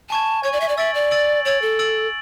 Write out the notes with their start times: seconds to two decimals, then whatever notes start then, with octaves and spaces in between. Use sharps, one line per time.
0.10 G#5 A5 C#6 G#6
0.43 C#5 G#5 C#6 G#6
0.53 D5
0.60 E5
0.69 D5
0.77 E5 E6 A6 D7 F#7
0.94 D5
1.11 E6 A6 D7 F#7
1.45 C#5 E6 A6 D7 F#7
1.62 A4
1.79 E6 A6 D7 F#7